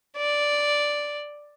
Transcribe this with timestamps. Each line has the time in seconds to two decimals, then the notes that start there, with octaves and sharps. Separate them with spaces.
0.17 D5